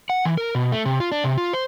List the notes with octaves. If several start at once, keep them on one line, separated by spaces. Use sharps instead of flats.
F#5
E3
A#4
B2
A3
C3
F4
D4
C3
F4
C5